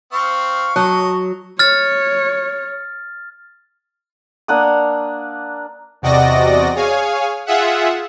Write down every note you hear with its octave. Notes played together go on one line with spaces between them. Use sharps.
C4 F5 C#6
F#3 C#5 D#5 A5 F#6
C#5 F6 A6
A#3 D4 F#5 D#6
E2 C3 F#4 D5 D#5 A#6
G#4 C#5 F5 G#5
F4 G#4 E5 F#5